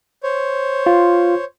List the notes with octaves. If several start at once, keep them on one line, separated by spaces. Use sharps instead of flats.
C5 C#5
F4